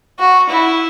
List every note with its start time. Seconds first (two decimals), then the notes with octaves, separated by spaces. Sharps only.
0.19 F#4
0.49 E4